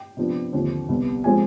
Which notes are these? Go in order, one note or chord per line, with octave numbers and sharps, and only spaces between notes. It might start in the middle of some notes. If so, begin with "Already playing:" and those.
Already playing: G5
C3 F3 B3 D4
D#2 D3 F3 C4
C2 B2 G3 B3
C3 F3 G#3 C4 G#5